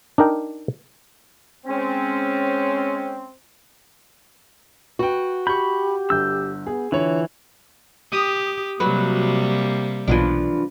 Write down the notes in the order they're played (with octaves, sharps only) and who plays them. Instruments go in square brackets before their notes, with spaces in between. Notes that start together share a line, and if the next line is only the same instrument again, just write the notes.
[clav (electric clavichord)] D4 D#4 A#4 G5
[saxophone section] G#3 C#4 [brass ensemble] C4
[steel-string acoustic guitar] F#4 [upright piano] B4 G5
[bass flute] G4 [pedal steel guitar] B5 [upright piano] C#6 G6
[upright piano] G1 D4 [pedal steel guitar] E6 G6
[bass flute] B3 [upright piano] G#4
[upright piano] D3 C#5 [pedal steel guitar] E3 [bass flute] F4
[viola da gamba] G4 [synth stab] D#6
[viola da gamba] C3 G3 A#3 [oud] F#3 B4
[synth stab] B1 [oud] E3 F3 D4